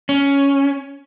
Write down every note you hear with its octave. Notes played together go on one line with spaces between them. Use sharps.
C#4